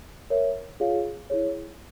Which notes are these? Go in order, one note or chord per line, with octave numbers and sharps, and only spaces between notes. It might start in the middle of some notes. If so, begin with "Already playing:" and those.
A#4 C#5 E5
F4 G#4 C#5 F5
E4 G#4 C#5